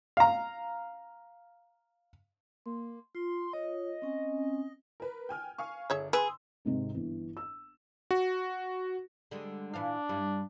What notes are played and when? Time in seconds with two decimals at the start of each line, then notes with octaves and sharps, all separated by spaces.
0.17 F5 A#5
2.66 A#3 C6
3.15 F4 C6
3.53 F4 C#5 D#5
4.02 C4 C#4 G#5
5.00 A#4 B4
5.29 G5 G#5 F6
5.58 F5 G#5 C#6
5.90 G1 G#4 C#5 E5
6.13 G#4 B4 C6 E6
6.65 G#1 G#2 C3 G#3
6.94 G1 E3
7.37 E6
8.11 F#4
9.31 D3 G3 G#3
9.74 A#2 E3 D4 F5
10.09 G2 G3 E4